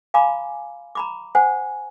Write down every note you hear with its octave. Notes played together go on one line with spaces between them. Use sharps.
F5 G#5 A#5 B5 D6
A#5 B5 D6
C5 F#5 G#5